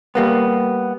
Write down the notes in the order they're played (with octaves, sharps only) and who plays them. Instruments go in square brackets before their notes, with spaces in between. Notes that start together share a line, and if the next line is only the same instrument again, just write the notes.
[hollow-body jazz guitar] G3 A#3 B3